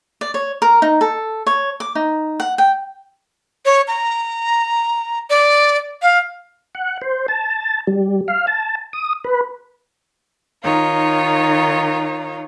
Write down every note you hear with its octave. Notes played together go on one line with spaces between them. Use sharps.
D5
C#5
A#4
D#4
A4
C#5
D6
D#4
F#5
G5
C#5
A#5
D5
F5
F#5
C5
A5
G3
F5
A5
D#6
B4
D#3 D#4 F4 C#5